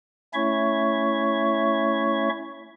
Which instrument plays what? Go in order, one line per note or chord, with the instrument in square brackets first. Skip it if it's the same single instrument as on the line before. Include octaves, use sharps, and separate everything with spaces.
[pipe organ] A3 C#4 E4 C#5 E5 C#6